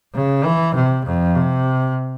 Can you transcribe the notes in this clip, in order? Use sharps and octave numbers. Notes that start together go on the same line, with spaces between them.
C#3
E3
C3
F2
C3